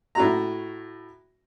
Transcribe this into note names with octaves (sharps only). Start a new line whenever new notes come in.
A2 F#4 A#5